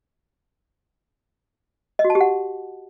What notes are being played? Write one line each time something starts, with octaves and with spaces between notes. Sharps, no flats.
D#5
F#4
A5
G4
F#5